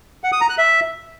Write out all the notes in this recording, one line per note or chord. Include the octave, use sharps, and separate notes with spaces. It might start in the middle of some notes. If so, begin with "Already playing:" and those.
F#5
D#6
A#5
F#6
E5